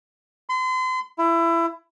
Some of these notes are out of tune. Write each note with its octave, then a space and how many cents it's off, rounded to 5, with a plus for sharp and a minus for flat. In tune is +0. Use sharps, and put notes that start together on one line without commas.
C6 -35
E4 +25